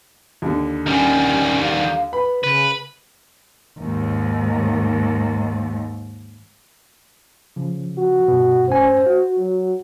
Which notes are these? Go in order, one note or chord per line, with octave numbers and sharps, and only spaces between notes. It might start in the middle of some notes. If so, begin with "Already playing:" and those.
D#2 D3
D#3 G3 C#4
F5
B4 B5
C#3 B4
D#2 G#2
C#3 F3
F#4
G2 B2
G2 C#4 C5 G#5
F#4
F#3